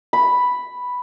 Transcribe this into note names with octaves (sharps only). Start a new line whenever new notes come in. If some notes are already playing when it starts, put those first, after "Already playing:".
B5